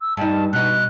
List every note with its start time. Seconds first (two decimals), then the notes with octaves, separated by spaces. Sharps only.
0.01 E6
0.17 G2 D#4 A5
0.53 B2 D#4 F#6